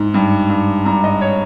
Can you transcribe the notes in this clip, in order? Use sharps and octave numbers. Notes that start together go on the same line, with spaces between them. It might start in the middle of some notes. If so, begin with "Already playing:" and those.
Already playing: G#2
G2
G2
G2 A#5
D#5
C#5